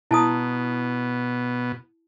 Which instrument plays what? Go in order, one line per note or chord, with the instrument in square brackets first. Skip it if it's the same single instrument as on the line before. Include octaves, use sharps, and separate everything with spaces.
[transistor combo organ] B2 [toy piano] E4 A5 D#6